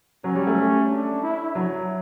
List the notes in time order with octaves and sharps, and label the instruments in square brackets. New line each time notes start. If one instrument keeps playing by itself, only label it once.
[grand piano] F#3 [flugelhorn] C#4
[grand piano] G3
A3
[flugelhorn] D4
E4
[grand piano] F#3